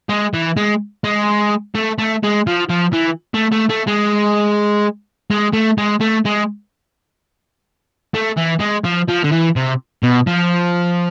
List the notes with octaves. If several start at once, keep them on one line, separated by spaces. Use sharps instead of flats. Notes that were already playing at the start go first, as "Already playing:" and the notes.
G#3
E3
G#3
G#3
A3
A3
G#3
F3
F3
E3
A3
A3
A3
G#3
G#3
A3
G#3
A3
G#3
A3
E3
G#3
F3
F3
D3
E3
C3
B2
F3